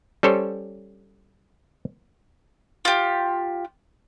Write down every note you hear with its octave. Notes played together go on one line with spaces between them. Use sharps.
G3 C#4 A4 C5 C#5
F4 G4